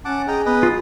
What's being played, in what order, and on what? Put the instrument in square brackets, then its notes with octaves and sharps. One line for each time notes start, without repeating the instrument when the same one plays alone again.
[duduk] C#4 [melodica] F#5 A5 D6
[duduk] G#4 [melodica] D#5 G5 A#5
[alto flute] B3 [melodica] B4 D#5
[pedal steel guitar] F4 D#6